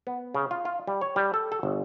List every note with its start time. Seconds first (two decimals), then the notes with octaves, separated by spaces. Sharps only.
0.07 B3
0.35 C#3
0.51 F4
0.65 F4
0.87 G3
1.01 C#5
1.16 G3
1.34 A4
1.52 A4
1.63 G1